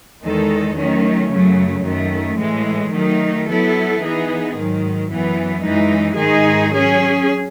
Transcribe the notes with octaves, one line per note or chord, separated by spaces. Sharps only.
E2 D#3 G#3 D#4 A4
D#3 F#3 A3 C#4
F#2 C#3 F#3 A3
F#2 D#3 A3
A2 E3 G#3
D#3 F#3 A3 D#4
F#3 B3 E4 A4
E3 B3 D#4 G#4
G#2 D#3 F#3
F#2 E3 B3
F#2 E3 G#3 D#4
G#2 D#3 G#3 D#4 G#4
F#3 C#4 G#4